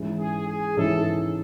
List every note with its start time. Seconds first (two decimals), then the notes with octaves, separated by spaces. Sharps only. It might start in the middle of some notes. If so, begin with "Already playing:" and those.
Already playing: G#2 E3 G#3 C#4 E4
0.20 G#4
0.47 G#4
0.76 G#2 E3 G#3 C#4 E4 A4